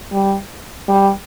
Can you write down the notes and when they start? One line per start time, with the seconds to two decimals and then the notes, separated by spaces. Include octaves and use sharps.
0.13 G3
0.88 G3